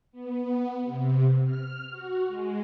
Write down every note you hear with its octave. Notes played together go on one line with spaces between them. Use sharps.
B3
C3
F6
F#4
G#3